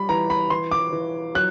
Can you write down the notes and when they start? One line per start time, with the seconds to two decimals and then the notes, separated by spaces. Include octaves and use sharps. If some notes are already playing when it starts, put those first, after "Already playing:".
Already playing: G3 B5
0.09 E3 A#5
0.30 B5
0.50 E3 C6
0.71 D6
0.93 E3
1.35 F#3 F#6